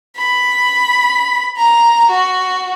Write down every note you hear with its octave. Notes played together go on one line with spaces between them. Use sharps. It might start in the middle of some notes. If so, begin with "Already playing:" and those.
B5
A#5
F#4